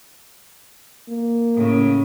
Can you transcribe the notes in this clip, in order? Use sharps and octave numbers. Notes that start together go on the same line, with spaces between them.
A#3
A2 C#3